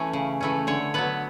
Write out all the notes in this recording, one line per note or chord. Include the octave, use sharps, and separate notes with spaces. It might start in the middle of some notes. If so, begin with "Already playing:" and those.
Already playing: E3 A3 C#4
C#3
E3 A3 C#4
D3 C#5
F#3 B3 B4